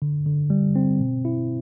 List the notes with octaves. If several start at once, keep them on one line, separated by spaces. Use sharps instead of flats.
D3
D3
G3
C4
B2
E4